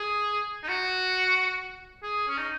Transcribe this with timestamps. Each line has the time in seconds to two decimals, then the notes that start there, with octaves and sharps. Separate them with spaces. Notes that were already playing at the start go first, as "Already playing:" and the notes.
Already playing: G#4
0.63 D#4
0.68 F#4
2.03 G#4
2.28 C#4
2.38 D#4